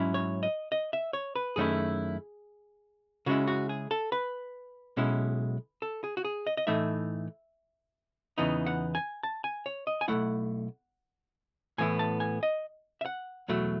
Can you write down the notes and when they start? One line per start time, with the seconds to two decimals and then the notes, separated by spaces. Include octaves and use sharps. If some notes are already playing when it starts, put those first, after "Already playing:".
Already playing: G#2 F#3 C#4 E4
0.14 C#5
0.43 D#5
0.72 D#5
0.93 E5
1.13 C#5
1.35 B4
1.56 F#2 D#3 A3 C#4 E4 G#4
3.26 C#3 G#3 C#4 E4 F#4
3.48 F#4
3.69 G#4
3.91 A4
4.12 B4
4.97 B1 B2 G#3 C#4 E4
5.82 A4
6.04 G#4
6.17 F#4
6.25 G#4
6.47 D#5
6.57 D#5
6.67 A2 E3 A3 D#4 E5
8.38 E2 C#3 E3 B3 D#4
8.67 F#5
8.95 G#5
9.23 A5
9.44 G#5
9.66 C#5
9.87 D#5
10.01 G#5
10.08 B1 B2 A3 E4 F#5
11.78 A2 E3 B3 E4 G#5
11.99 A5
12.20 G#5
12.43 D#5
13.01 E5
13.06 F#5
13.48 E2 B2 F#3 A3